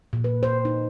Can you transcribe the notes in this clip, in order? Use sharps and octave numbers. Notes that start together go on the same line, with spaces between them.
A#2
B4
C5
D#4